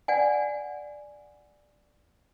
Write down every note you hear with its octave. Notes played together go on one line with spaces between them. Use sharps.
D5 F#5 G#5